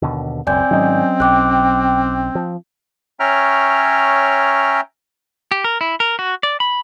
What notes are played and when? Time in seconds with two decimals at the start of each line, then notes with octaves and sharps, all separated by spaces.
0.02 D#2 B2 D3
0.47 E1 C#2 F#2 C4 D5 G#5 G6
0.71 G#2 D#3 F#3 C#4 D#5
1.20 B1 G5 D6 F#6
2.35 F3
3.20 C#4 C#5 E5 G5 A#5 F6
5.52 G4
5.64 A#4
5.81 E4
6.00 A#4
6.19 F#4
6.43 D5
6.60 B5